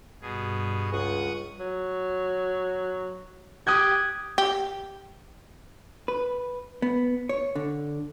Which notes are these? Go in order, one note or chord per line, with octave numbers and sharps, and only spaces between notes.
G2 B2 G#4
C#2 F#5 C#6 D#6
F#3
G4 D#6 F#6 G#6
G4
B4
B3
C#5
D3